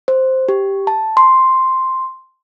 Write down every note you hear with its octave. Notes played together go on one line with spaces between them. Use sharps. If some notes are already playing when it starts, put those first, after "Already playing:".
C5
G4
A5
C6